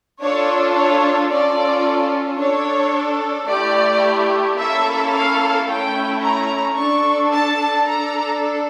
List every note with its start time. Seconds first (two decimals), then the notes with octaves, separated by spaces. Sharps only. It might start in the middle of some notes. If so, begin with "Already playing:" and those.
0.20 D4 F4 A4 C#5
0.75 C#5
1.30 C#4 F4 A4 D5
2.39 D4 A4 C#5
3.49 A3 E4 G4 D5
4.58 A#3 C#4 E4 A4 E5
5.13 F5
5.67 A3 C#4 E4 A4 G5
6.22 A#5
6.76 D4 A4 C#6
7.31 A5
7.85 D4 A4 A#5